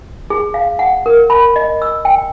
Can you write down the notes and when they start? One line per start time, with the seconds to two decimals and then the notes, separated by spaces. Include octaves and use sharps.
0.30 G#4
0.54 F5
0.79 F#5
1.06 A#4
1.30 B5
1.56 D#5
1.82 E6
2.05 G5